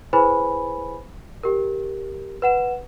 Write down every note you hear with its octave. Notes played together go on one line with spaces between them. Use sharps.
E4 G#4 B4 C5 G#5 B5
G4 A#4
B4 F#5 E7